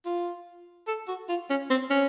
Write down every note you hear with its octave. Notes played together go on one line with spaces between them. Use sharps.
F4
A4
F#4
F4
C#4
C4
C#4